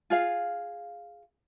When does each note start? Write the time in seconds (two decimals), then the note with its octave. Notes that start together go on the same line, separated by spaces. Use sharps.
0.10 F4 G#4 F5